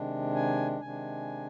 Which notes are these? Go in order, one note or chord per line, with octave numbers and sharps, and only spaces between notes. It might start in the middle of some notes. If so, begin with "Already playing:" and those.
Already playing: C3 D#3 G#3 D4
G#5
C3 D#3 G#3 D4 G#5